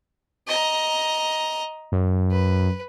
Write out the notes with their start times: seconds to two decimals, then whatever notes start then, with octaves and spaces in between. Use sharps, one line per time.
0.48 D#5 A#5
1.92 F#2
2.31 B4